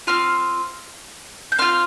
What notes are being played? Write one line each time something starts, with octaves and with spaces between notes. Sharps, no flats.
C4 F4 F6
G6
C4 F4 F6